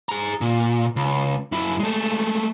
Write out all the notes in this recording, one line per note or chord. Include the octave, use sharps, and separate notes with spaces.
G#4 A#5
A#2
C#2
F#2 E4
G#3 A3